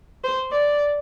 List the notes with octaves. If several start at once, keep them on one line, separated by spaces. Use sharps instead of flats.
C5
D5